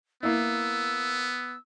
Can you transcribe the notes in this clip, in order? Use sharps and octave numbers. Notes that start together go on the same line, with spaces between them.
A#3 B3 E4 E6